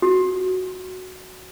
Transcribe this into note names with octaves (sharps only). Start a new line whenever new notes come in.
F#4